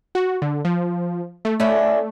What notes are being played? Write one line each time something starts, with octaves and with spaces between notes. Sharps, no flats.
F#4
D3
F3
A3
A3 C#4 D4 E4